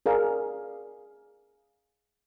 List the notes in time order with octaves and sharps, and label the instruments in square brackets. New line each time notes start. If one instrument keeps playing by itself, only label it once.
[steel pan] G#4 A#4 D5 F5